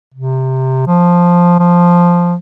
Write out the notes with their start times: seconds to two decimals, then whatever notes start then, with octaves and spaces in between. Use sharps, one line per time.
0.14 C3
0.87 F3
1.59 F3